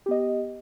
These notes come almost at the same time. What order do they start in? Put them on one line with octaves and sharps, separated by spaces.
G4 B3 D#5